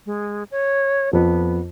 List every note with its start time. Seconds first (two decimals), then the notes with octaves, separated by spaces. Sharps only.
0.06 G#3
0.51 C#5
1.13 F2 B3